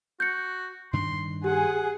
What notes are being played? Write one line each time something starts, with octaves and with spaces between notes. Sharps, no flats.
F#4 G6 C#7
G2 D#3 D4 C6
G4 G#4 F#5